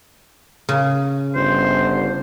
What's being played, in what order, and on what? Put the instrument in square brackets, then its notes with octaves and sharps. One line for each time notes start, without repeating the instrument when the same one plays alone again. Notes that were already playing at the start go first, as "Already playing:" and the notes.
[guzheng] C#3
[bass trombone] G1 [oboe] C5